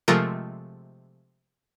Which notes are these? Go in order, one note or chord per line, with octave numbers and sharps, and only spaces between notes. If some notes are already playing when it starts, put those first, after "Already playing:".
C3 F3 G#3 A3 F4 A#4